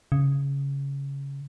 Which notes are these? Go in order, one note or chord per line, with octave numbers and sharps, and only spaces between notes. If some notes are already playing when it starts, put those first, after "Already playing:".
C#3